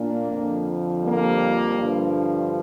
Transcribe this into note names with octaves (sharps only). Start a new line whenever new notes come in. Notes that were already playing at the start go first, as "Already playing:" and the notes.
Already playing: A#2 A#3 D4
F2 D3 F3
G3 A#3
G2 D3 F3